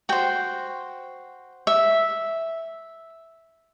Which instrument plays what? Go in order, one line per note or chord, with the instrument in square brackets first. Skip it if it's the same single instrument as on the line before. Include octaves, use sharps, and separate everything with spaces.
[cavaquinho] F#4 C5 G5
E5